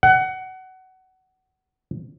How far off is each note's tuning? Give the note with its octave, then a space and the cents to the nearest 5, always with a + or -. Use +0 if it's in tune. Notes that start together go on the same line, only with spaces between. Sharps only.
F#5 +20